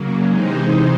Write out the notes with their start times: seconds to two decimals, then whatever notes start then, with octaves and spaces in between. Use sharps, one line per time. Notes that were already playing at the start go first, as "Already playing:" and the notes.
Already playing: C#3 F#3 A#3
0.27 C3 E3 G#3 C4 D#4